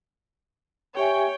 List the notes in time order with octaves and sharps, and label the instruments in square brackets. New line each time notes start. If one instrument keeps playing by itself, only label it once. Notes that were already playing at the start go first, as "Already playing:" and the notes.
[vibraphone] G4 E5 G#5 [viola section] C#5 G5